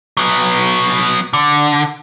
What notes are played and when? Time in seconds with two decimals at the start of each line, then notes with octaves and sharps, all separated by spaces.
0.17 F#3 B3
1.33 D3